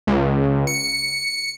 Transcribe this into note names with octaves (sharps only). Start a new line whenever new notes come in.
C#2
C#7